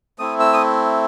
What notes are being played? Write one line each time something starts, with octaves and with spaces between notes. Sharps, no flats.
A3 C4 E4 D#6
E6
D#6